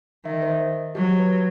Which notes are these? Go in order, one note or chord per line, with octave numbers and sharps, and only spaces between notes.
D#3 E5
D#5
C5
D#5
F#3 G4
B4